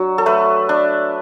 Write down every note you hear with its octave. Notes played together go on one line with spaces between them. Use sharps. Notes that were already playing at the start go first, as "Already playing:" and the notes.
Already playing: F#3 D4
A4
A3 B4
D4